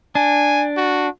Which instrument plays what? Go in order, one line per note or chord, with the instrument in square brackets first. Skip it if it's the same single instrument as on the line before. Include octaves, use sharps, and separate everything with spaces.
[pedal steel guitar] D4 [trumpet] G#5
[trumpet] F#4